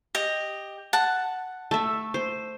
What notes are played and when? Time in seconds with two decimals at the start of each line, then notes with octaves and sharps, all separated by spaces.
0.15 G4 D#5
0.93 F#5 A5
1.71 A3 E5
2.14 C5